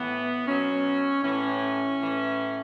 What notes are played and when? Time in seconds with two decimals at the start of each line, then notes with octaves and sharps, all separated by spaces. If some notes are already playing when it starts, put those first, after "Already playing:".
Already playing: A2 E3 B3
0.47 B2 F#3 C#4
1.23 A2 E3 C#4
2.00 A2 E3